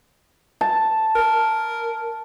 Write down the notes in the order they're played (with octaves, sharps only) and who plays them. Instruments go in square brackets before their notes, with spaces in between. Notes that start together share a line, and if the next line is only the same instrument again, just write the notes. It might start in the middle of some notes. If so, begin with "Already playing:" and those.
[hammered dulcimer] A5
[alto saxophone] A#4